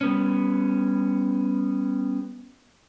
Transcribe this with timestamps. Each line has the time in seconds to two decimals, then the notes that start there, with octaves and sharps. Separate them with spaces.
0.01 G3 B3 C#4